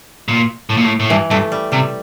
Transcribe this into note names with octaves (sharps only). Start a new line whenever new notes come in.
A#2
A2
A#2
A2
A2
G2 E3
G2 A3
G3
C3 G3